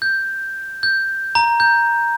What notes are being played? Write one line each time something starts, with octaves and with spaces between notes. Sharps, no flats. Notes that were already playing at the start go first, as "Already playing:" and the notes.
G6
G6
A#5
G6